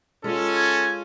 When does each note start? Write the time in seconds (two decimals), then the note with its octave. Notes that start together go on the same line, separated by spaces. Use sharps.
0.24 G#3 C#4 F4 A4
0.55 G#5